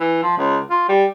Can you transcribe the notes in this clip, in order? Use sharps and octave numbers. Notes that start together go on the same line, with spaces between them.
E3
F3
C#2
F4
G3